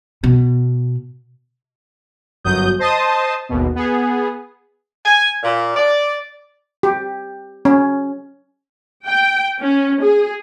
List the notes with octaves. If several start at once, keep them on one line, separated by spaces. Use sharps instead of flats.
B2
G1 F#2 F#3 D#6 G6
C5 D#5 A5 C6 D#6
G#1 D#2 B2
B3 G#4
G#5
A#2
D5
G4
C#4
G5
C#4
G#4